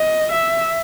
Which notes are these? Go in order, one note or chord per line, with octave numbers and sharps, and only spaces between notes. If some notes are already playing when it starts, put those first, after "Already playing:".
Already playing: D#5
E5